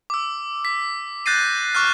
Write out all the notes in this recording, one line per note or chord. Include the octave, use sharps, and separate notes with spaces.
D6 E6
B6
F#6 G6 A6 A#6 C7 D#7
C#6 D6 F6 F#6